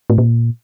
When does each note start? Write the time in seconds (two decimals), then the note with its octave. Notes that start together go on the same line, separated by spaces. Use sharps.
0.10 A2
0.18 A#2